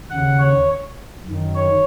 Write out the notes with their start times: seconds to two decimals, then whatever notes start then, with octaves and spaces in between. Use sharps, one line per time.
0.10 D#2 C#3 F#5
0.39 C#5
1.26 F#2 D#3
1.55 C#5